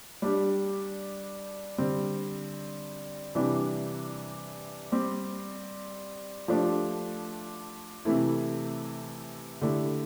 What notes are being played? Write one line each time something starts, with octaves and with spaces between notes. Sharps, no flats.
G3 D4 G4
D3 G3 C4
C3 E3 G3 D4 G4
G3 C4 G4
F3 A3 D4 G4
C3 E3 A3 E4
D3 A3 E4 G4